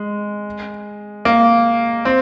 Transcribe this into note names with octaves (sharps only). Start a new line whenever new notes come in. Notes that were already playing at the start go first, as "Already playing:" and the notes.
Already playing: G#3
A#3
C4